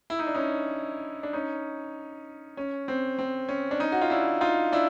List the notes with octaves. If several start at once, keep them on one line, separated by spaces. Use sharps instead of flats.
E4
D#4
D4
C#4 D#4
D4
C#4 D#4
C#4
C4
C4
C#4
D4
C#4 D#4
F#4
F4
D4 E4
D#4 F4
D4 E4